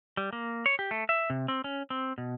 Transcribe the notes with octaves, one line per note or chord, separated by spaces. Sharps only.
G3
A#3
C#5
G4
A3
E5
C3
C4
C#4
C4
B2